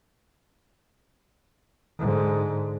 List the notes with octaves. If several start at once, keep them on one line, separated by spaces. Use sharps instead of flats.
G#2 D3